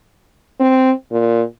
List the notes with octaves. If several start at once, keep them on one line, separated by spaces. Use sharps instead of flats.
C4
A#2